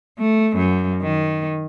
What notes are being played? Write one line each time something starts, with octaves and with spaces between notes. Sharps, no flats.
A3
F#2
D#3